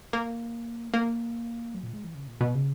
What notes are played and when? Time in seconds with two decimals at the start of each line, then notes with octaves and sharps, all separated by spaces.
0.13 A#3
0.94 A#3
1.75 F#3
1.83 A#2
1.93 G#3
2.04 E3
2.15 C#3
2.27 A#2
2.41 B2
2.55 C#3